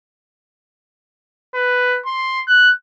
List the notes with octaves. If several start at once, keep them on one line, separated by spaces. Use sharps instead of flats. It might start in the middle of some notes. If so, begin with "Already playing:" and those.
B4
C6
F#6